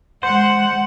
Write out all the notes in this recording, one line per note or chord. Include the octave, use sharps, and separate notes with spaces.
G#3 C5 F#5